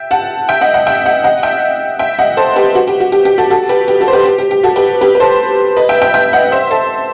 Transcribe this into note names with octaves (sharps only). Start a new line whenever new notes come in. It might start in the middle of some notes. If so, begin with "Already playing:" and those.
Already playing: E5 G5
F#5 A5
E5 G5
D#5 F#5
D#5 F#5
E5 G5
D#5 F#5
D#5 F#5
E5 G5
E5 G5
D#5 F#5
A4 C5
G4 B4
F#4
G4
F#4
G4
G4
F#4 A4
F#4 A4
G4 B4
G4
F#4 A4
C5
G4 B4
G4
G4
G4
F#4 A4
G4 B4
G4 B4
B4
A4 C5
B4 D#5
E5 G5
E5 G5
E5 G5
D#5 F#5
C5 E5
A4 C5